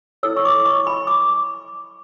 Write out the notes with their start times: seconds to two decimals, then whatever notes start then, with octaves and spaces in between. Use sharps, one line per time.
0.23 E4 A4 C#5 E6
0.37 C#6
0.45 D6
0.65 C#6
0.87 B5
1.07 D6